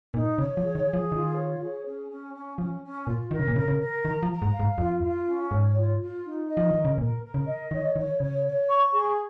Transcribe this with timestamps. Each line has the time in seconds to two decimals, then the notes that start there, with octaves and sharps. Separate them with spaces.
0.13 A#2 D#4
0.38 C#3 C#5
0.57 F3
0.62 G#4
0.75 D#3
0.87 G#4
0.93 F3
1.12 D#3 F4
1.36 C#5
1.60 G#4
1.85 C#4
2.09 C#4
2.34 C#4
2.58 F3 C#4
2.83 C#4
3.07 A#2 F4
3.31 D#3 A#4
3.40 C#3
3.48 A#2
3.56 C#3 A#4
3.68 C#3
3.80 A#4
4.05 D#3 A#5
4.23 F3
4.29 A#5
4.42 G#2
4.54 F5
4.59 G#2
4.78 F2 F4
5.02 F4
5.27 C#4
5.51 G#2 C#5
5.76 F4
6.00 F4
6.24 D#4
6.48 D#5
6.57 F3
6.71 D#3 A#4
6.85 C#3
6.98 A#2 A#4
7.22 A#4
7.34 C#3
7.47 D#5
7.71 D#3 C#5
7.96 D#3 C#5
8.20 C#3 C#5
8.44 C#5
8.69 C#6
8.93 G#4